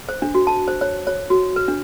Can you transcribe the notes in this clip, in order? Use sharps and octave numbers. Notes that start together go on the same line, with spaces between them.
C5
D4
F#4
A5
C5
C#5
C#5
F#4
B4
D4